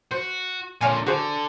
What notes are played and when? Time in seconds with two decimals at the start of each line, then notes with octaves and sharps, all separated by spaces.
0.11 F#4 C5
0.81 A#2 D3 C#5 F5 G#5
1.07 D3 F#4 G#4 C5